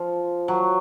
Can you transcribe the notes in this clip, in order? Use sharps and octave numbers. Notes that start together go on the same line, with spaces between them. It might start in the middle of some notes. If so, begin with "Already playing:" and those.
Already playing: F3
F#3